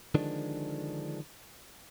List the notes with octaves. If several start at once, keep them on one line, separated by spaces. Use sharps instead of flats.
D3 D#3 F3 G#3 D4